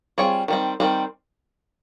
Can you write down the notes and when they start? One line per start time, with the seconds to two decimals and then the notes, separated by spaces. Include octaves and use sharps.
0.18 G3 C4 F4 G#4 C#5
0.48 D#3 G3 C4
0.80 D#3 G3 C4